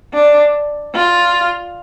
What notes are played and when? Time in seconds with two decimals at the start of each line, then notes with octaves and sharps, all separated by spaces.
0.14 D4
0.95 F4